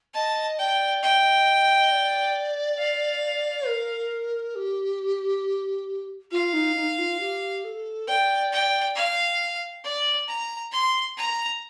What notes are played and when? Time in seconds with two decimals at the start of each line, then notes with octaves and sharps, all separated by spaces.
0.14 D#5 A5
0.58 D5 G5
1.03 D#5 G5
1.91 D5
2.79 F5
3.67 A#4
4.55 G4
6.31 F4 F5
6.53 D#4
6.76 D#4
6.98 F4
7.19 G4
7.64 A4
8.08 D5 G5
8.52 G5
8.96 F5
9.84 D5
10.28 A#5
10.72 C6
11.17 A#5